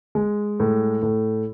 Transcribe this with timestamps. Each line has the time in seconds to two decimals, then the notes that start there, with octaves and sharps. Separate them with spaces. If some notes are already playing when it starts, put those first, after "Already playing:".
0.15 G#3
0.60 A2
1.02 A2